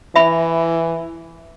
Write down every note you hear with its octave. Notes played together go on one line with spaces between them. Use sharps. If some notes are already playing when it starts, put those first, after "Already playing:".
E3 E5 B5